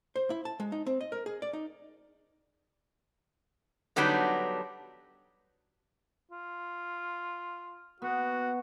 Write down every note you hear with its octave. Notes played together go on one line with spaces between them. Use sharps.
C5
E4
A5
G#3
D#4
C4
D#5
A#4
G#4
D5
D#4
D3 F#3 G3 B3 D4 D#4
F4
B3 F#4